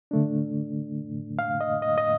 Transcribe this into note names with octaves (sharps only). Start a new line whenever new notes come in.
D3 A3 D4
F5
D#5
D#5
D#5